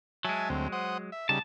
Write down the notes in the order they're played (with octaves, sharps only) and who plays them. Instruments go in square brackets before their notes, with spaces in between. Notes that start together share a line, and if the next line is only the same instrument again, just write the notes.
[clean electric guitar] F#3 G#3 [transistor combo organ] E5 G#5 A5
[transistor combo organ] D2 C4
C5 F#5 D#6
E5
[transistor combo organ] C#3 G3 D#4 [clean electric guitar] A5